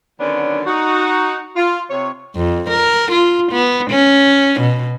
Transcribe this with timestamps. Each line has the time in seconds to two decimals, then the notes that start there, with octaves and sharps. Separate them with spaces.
0.20 D3 D#3 F#3 B3 C#4 D4
0.66 D#4 F#4
1.56 F4
1.90 C3 C#5
2.35 F2
2.70 A#4
3.11 F4
3.52 B3
3.91 C#4
4.60 B2